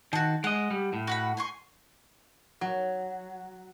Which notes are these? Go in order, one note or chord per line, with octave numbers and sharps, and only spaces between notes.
D#3 F#4 A5
G#3 D#5 F#5
G3
A2
F#4 F#5 B5
G#5 C6 C#6
F#3